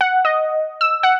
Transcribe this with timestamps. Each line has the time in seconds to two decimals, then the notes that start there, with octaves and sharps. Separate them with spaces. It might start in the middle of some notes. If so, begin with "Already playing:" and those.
0.01 F#5
0.25 D#5
0.81 E6
1.03 F#5